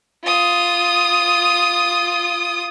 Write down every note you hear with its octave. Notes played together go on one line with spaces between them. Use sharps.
F4 D#6